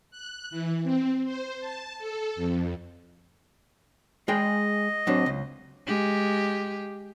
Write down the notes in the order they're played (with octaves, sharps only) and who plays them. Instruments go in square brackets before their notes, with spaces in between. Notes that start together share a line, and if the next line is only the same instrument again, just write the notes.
[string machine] F#6
E3
C4
C5
A5
A4
F2
[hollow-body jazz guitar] G#3 G#4 G5 [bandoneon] D#5
[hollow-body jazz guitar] F#3 C4 D4
C#2
[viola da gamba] G#3 G4